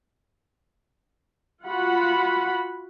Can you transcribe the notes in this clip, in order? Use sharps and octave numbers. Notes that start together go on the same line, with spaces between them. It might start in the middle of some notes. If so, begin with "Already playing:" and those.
F4 F#4 F#5 B5